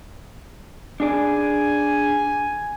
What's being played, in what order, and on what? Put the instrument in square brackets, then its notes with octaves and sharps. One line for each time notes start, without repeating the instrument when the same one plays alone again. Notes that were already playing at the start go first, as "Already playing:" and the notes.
[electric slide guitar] D4 G#4 D5 [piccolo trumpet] G#5